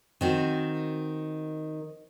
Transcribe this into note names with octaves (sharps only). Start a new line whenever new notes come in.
D#3 C4 F#4